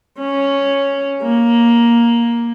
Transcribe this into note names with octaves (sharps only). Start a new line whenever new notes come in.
C#4
A#3